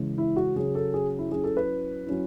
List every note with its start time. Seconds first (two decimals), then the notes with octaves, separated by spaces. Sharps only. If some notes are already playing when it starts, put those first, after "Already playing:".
Already playing: C#3 E3 G#3 C#4
0.18 E4
0.36 F#4
0.55 C#3 F#3 C#4 G#4
0.75 A4
0.94 G#4
1.19 E4
1.31 F#3 C#4 E4 G#4
1.44 A4
1.57 B4
2.07 F#3 C#4 E4